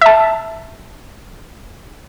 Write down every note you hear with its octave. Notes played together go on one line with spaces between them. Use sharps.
E5 A5